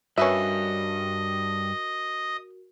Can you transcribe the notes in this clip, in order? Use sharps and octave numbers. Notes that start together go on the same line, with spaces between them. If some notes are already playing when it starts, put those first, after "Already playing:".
G2 C#4 F#4 A#4 B4 D#5 E5